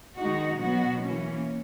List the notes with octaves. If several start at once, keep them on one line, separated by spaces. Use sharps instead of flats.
D#3 G#3 D#4 F#4
B2 F#3 B3 F#4
E3 A#3 C#4